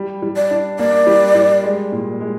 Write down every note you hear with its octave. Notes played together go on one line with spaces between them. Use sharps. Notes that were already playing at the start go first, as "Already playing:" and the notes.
Already playing: G3
G3
D5
D4
A#3 D5
G3
G3
G#3
A#2
G#3